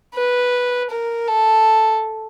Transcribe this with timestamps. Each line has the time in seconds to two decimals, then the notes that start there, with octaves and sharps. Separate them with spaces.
0.14 B4
0.90 A#4
1.27 A4